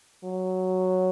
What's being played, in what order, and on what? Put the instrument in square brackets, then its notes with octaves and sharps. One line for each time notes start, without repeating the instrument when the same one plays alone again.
[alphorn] F#3